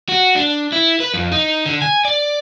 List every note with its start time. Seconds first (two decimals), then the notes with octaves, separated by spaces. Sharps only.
0.09 F#4
0.35 D4
0.72 E4
1.00 B4
1.14 F2
1.32 D#4
1.66 D3
1.82 G#5
2.05 D5